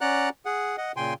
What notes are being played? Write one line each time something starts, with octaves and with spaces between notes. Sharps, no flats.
C#4 D5 F#5 A#5 F#6
G#4 F#5
D#5 F#5
A#2 C#3 G5 G#5 C6